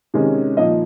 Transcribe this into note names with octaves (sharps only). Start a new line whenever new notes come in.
C3 D#3 G#3 C#4
A#2 F3 A#3 D#4 D#5